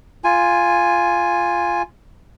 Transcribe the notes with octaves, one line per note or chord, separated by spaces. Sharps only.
F4 G#5